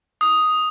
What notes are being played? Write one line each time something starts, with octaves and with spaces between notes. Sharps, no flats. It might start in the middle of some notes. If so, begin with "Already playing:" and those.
D#6